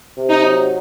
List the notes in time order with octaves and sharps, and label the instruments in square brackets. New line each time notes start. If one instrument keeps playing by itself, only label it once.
[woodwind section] C3
[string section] D#4
[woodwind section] F#3